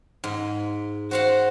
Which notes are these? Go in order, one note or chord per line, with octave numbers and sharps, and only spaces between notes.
G#2
F#4 C5 F5 F#5